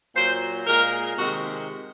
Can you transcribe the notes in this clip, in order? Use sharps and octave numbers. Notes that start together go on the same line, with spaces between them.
A#2 F#3 C5
A#2 G#3 A#4
C3 D#3 G#3 F#4